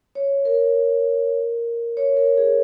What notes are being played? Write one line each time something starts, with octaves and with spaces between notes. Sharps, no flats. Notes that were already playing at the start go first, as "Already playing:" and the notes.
C#5
A#4
C#5
A#4
G#4